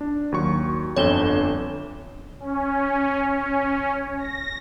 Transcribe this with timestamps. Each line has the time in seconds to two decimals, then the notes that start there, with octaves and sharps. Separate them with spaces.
0.01 D4
0.32 D#2 F#3 C#6
0.96 G1 F2 D3 C#5 E7 G7
2.40 C#4
3.29 C#4
4.19 A#6